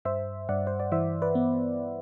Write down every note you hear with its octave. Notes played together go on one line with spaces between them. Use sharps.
G2 C5 E5
G2 D5 F#5
C5
D5
E3 C5 E5
B4 D5
B3